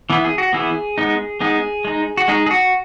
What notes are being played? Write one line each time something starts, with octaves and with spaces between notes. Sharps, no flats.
E3 B3 E4
G#4
F#4
E3 B3 E4 G#4
G#3 B3 D#4
G#3 B3 D#4 G#4
G#3 D#4
F#4
G#3 D#4 G#4
G#4
F#4